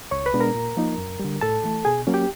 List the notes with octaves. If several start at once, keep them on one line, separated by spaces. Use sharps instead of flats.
C#2 C#5 C#6
B4 B5
B2 G#3 B3 D4
A#4 A#5
A#2
F3 A#3 D#4
F#2
D3 G3
A2 A4 A5
E3 A3
B2 G#4 G#5
F#3 A#3 C#4
G4 G5